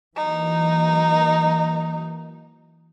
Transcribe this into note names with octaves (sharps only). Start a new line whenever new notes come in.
E3 F#3 A#3 D#4